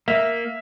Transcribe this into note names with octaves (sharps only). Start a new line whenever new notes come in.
A#3 E5